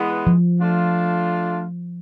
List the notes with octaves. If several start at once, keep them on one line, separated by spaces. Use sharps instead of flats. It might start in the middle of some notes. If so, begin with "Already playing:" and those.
Already playing: E3 G#3 B3
F3
A3 D4 F4